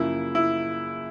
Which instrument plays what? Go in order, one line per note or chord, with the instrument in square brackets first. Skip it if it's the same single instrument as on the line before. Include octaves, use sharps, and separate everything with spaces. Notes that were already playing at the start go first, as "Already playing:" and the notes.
Already playing: [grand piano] F#2 C#3 F3 A#3 [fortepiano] E4
[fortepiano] E4